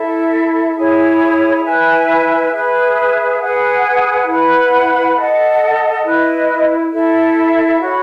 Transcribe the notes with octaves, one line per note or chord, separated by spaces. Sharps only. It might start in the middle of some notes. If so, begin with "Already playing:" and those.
Already playing: E4 A4 E5
E4 G#4 C#5
E4 B4 E5 G#5
G#4 B4 E5
G#4 B4 F#5
E4 B4 F#5 B5
A4 D#5 F#5
E4 B4 D#5
E4 A4 E5
F#4 C#5 F#5 B5